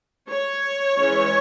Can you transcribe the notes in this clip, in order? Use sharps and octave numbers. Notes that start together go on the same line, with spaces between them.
C#5
E3 G#3 C#4